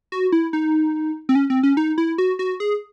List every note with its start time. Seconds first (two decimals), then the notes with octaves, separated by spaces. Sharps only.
0.12 F#4
0.32 E4
0.53 D#4
1.29 C4
1.35 C#4
1.50 C4
1.63 C#4
1.77 D#4
1.98 E4
2.18 F#4
2.39 F#4
2.60 G#4